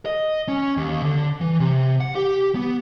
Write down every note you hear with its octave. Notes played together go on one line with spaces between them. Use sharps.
D#5
C#4
D#2
D3
E3
C3
F#5
G4
B3